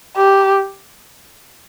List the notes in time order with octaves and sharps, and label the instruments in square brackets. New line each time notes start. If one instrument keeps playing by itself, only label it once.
[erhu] G4